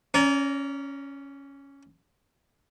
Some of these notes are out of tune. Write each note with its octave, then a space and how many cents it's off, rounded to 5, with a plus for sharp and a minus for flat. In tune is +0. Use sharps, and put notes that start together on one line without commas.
C#4 +0 D5 -35 A#5 +0